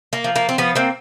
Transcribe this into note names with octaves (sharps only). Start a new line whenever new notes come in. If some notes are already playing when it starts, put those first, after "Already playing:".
A#3
F3
A#3
C4
F3 B3
A#3 C4